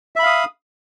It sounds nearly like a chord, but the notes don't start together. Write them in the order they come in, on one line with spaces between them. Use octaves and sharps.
E5 B5 F5 D#6